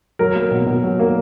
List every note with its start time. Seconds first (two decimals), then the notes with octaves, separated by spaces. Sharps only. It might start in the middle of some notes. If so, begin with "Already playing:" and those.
0.19 F#3 A#4
0.35 A#3
0.51 B2
0.67 B2
0.83 F#3
1.00 A#3